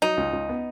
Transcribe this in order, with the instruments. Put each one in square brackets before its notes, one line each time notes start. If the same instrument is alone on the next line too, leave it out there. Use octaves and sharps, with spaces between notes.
[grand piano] F#3 [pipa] D#4
[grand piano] C#2
C#2
B3